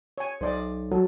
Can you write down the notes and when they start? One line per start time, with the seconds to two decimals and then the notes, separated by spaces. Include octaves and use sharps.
0.18 C#5 G#5
0.41 B1 C5 D5 D#5
0.92 F#3 A4